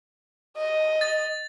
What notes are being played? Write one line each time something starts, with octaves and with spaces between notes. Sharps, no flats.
D#5
A6